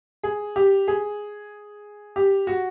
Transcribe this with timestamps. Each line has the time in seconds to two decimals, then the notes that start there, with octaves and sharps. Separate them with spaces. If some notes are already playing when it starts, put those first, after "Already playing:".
0.23 G#4
0.56 G4
0.88 G#4
2.16 G4
2.47 F#4